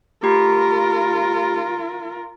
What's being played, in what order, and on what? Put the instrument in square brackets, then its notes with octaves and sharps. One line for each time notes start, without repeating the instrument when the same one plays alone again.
[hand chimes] A3 G4 B5 [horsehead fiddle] F4 A#4